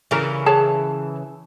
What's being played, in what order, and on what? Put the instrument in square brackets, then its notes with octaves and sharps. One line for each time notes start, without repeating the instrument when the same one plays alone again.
[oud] C#3 E3 A#4
[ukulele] G#4 C#5 A5